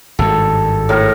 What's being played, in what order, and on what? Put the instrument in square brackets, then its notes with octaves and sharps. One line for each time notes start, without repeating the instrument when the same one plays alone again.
[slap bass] G#1 G2 [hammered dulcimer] A4
[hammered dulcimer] A2 A#4